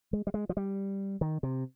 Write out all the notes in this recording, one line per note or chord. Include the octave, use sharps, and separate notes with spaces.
G#3
G3
G#3
F3
G3
D#3
C3